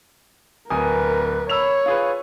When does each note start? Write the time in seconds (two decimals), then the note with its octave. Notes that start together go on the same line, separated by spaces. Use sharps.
0.70 D1 A#4 B4 G#5 D#6
1.49 C#5 B5 E6 F7
1.86 F4 G#4 B4